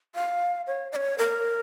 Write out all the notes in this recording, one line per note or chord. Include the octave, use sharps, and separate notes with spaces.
F5
C#5
D#5
C#5
A#4